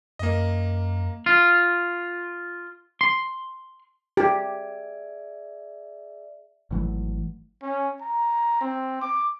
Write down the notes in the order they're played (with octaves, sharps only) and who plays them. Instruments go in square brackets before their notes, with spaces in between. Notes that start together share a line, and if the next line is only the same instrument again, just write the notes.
[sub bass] F#2 [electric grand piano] A#3 D#5
[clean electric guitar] F4
C6
[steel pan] G4 [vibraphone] G#4 D5 E5
[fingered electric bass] G#1 E3 F#3 A3
[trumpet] C#4
A#5
C4
D6